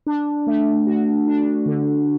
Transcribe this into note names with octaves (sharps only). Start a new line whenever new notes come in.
D4
A3
F#4
D4
D3